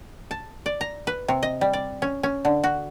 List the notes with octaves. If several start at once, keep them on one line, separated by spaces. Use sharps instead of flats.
A5
D5
A#5
B4
C3
D#5
G3
D5
C#4
C#4
D3
F#4